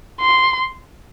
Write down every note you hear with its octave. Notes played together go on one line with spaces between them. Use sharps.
C6